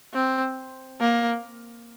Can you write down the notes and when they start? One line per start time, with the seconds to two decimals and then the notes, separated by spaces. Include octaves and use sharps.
0.14 C4
1.00 A#3